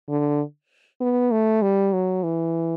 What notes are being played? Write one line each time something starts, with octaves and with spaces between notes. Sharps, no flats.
D3
B3
A3
G3
F#3
E3